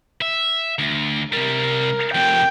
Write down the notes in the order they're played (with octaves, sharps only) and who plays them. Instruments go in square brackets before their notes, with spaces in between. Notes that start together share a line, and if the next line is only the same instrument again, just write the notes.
[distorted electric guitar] E5
D2
[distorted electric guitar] C3 G3 [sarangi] A#4
[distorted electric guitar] F2 C3 [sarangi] G5